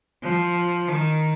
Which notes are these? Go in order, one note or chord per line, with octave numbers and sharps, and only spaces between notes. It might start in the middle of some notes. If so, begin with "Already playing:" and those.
F3
D#3